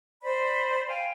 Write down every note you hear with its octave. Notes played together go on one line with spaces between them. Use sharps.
C5 D5 B5
F5 G5 G#5